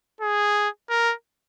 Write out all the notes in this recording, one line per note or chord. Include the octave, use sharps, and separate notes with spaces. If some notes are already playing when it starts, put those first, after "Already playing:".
G#4
A#4